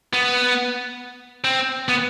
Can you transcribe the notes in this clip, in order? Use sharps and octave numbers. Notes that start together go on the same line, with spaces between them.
B3
C4
B3